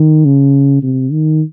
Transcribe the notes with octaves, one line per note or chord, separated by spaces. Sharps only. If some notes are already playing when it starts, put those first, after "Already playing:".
Already playing: D#3
C#3
C3
D#3